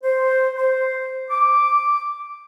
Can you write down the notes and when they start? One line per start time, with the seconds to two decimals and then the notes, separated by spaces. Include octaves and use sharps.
0.04 C5
0.56 C5
1.30 D6